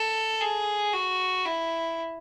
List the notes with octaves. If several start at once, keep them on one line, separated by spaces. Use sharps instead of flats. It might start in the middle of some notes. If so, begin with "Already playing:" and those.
Already playing: A4
G#4
F#4
E4